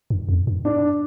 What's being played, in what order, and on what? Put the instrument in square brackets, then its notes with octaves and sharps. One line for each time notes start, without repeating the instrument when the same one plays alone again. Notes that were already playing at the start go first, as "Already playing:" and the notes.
[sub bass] G2
F2
G2
[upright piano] D4